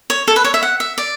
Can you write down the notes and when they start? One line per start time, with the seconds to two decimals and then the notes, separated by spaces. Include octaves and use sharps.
0.10 C#5
0.28 A4
0.36 B4
0.44 C#5
0.54 E5
0.63 F#5
0.80 E5
0.98 D5